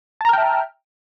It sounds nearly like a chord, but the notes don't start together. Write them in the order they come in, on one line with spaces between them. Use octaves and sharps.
A5 A#5 F6 G5 E5